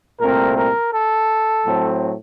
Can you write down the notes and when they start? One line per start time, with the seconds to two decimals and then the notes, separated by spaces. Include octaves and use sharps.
0.20 C2 A#2 A3 C4 A#4
0.56 A#4
0.92 A4
1.65 A2 F#3 C4